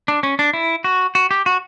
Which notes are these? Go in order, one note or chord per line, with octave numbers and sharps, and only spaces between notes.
D4
C#4
D4
E4
F#4
F#4
G4
F#4